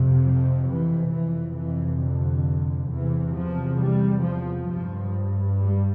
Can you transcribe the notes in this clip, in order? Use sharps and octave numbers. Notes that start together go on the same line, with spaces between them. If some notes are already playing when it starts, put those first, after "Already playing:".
Already playing: F2 C3
F3
E3
F2 C3 E3
E3
D3
E2 C3 E3
F3
G3
F3
G2 F3
G3